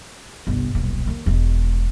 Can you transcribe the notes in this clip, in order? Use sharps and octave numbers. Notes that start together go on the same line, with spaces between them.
G1 C2
D#1 B1
D#2
E1 G#3